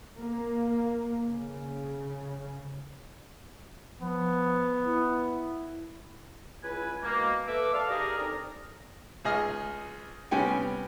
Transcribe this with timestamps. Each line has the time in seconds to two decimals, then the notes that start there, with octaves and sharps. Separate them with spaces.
0.18 A#3
1.28 C#3
4.01 F3 B3
4.84 E4
6.63 C#2 E4 B4 G#5
7.02 B2 G#3 A#3
7.48 A4 B4 E5 D6
7.74 A4 D5 F5
7.89 D#4 G4 G#4 A#4
8.18 C4 D4 D#4 A4 A#4
9.25 C#2 G#4 D#5 F6
10.31 C3 G3 B3 C#4 G5 G#5